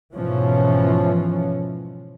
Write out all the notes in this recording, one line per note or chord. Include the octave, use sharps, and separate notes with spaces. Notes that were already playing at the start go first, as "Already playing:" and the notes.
G#2 B2 E3 F3 C#4